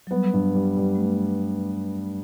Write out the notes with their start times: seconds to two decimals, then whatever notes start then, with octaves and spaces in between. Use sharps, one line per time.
0.07 F#3
0.11 G3 B3
0.33 G2
0.55 G3
0.77 G3
0.95 A3